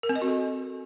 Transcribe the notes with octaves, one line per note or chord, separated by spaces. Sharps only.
A#4
C4
D#5
F#4
A4